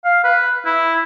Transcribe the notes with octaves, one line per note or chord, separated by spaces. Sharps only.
F5
B4
E4